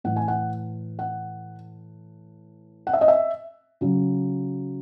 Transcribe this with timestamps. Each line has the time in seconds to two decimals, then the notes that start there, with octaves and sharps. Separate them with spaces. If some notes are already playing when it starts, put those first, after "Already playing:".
0.04 A2 E3 F#5
0.16 G#5
0.28 F#5
0.99 F#5
2.87 F#5
2.93 E5
3.01 D#5
3.08 E5
3.81 C#3 F#3